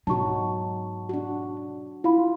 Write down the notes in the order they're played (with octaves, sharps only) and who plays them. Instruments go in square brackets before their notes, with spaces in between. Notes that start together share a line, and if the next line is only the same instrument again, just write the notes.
[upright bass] G#2 B2 [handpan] F#3 D#4 F#4 [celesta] A5 C#6
[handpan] D4 F#4
[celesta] E4 F5 B5 [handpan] F4